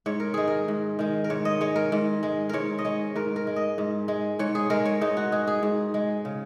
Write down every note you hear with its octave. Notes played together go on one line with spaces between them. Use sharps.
G#2 C#5
A#4
D#3 G#3 G#4
A#4
G#2
D#3 G#3
A#4
G#2 C#5
D#5
G#3 C#5
A#4
G#2
G#3
G#2 A#4 C#5
D#5
G#3 C#5
G#2 A#4
A#4
G#3
D#5
G#2
G#3
G#2 C#5
G#4
G#3 A#4
C#5
G#2 D#4
F#4
G#3 G#4
G#4
G#2
G#3
C#3